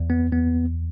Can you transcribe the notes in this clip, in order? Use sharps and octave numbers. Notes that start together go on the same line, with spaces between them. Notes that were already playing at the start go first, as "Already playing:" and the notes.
Already playing: E2
B3
E2 B3